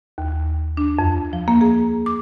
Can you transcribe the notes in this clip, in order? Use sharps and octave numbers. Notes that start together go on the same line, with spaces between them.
D#2
D4
F2
F3
A#3
G#4
D6